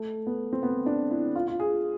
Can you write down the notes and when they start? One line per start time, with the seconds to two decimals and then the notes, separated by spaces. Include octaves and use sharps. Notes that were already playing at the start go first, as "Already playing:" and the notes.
Already playing: A3
0.27 B3
0.53 C4
0.63 B3
0.86 D4
1.11 E4
1.36 F4
1.48 F4
1.60 G#4